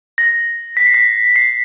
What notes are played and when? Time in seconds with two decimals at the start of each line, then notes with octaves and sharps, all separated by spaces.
0.18 A#6
0.77 B6
0.86 C7
0.94 B6
1.36 C7